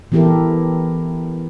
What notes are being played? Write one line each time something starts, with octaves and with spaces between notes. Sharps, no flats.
E3 B3 E4 G4 A4 A#4